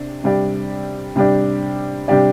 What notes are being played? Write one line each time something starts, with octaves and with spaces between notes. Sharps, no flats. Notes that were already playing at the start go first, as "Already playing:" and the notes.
Already playing: C3 D4
C3 G3 D4 G4 D5
C3 G3 D4 G4 D5
C3 G3 D4 G4 D5